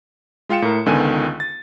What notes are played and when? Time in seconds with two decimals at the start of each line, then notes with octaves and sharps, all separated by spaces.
0.49 G#3 F4 F5 G5 C#7 E7
0.62 A2 A#4
0.86 C#2 D3 D#3 B3 G#5 D#7
1.40 A6